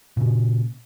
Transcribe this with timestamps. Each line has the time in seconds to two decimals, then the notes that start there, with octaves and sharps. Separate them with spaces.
0.17 A#2 C#3